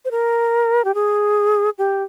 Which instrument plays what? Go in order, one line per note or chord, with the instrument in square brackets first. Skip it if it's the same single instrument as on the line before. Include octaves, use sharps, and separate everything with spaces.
[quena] C5
A#4
G4
G#4
G4